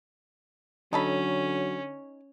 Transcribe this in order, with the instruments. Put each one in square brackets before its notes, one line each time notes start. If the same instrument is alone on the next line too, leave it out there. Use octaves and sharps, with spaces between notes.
[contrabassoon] D3 [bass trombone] F#3 [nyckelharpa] C#4 [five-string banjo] D#4 A4 B5